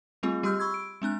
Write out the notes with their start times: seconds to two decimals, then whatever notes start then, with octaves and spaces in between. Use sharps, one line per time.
0.23 G3 A3 C4 F4 G#4
0.43 G3 G4 C6 E6 F6 G6
0.60 B5 C#6 E6 G#6
0.74 D7
1.02 G#3 C4 D4 F#6